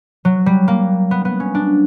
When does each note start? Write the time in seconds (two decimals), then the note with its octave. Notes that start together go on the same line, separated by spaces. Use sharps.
0.25 F#3
0.46 G3
0.68 A#3
1.11 B3
1.25 B3
1.40 C#4
1.55 D4